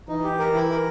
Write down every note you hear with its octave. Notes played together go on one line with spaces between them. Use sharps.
E3 D#4
G4
A#4
E3 E4
A#4